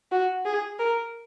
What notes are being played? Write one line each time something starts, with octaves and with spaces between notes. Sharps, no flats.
F#4
G#4
A#4